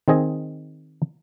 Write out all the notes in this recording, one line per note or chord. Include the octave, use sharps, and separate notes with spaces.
D#3 C4 G#4 D#5